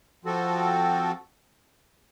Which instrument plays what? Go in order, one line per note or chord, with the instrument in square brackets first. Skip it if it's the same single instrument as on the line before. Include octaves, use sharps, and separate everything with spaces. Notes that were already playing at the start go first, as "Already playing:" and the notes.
[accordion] F3 C4 F#4 A4